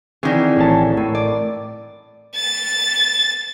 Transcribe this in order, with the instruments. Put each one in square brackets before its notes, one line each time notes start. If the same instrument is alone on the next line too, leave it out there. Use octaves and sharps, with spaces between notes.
[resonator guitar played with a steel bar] D#3 G#4 [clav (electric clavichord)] E3 [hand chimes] C4 E4 D5
[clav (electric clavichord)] A1 C#4 A5
[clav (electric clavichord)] A2 [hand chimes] A#4
[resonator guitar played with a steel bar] D5
[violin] A6